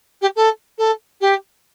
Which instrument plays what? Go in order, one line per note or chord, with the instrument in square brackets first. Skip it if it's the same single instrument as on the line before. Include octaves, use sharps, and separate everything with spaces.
[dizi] G4
A4
A4
G4